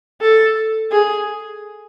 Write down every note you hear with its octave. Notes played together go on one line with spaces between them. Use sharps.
A4
G#4